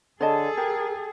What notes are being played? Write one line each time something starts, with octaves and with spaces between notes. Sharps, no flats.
D3 G#4 A4 C#5 D#5 A5
G4 A#4